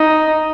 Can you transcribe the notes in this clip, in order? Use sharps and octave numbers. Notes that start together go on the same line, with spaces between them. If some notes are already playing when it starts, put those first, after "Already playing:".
Already playing: D#4